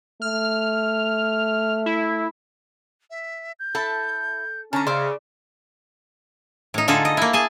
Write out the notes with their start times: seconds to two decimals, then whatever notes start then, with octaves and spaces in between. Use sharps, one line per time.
0.22 A3 F6
1.86 E4
3.10 E5
3.59 G6
3.75 E4 A4 E5 A5
4.73 D3 C#4 A5 A#5 F6
4.87 C#3 C5 D5 E5 F6
6.74 A2 D#4
6.88 D3 D#4 F4 G#4 A4
7.05 D#5
7.17 A#3 E4
7.33 G#4 G#5 A5